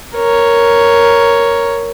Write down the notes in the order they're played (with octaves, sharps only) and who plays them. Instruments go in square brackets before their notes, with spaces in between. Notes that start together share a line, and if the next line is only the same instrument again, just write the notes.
[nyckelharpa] A#4 C#5